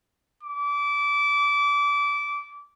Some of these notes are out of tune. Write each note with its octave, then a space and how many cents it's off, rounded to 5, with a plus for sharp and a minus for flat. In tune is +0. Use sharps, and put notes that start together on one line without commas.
D6 -25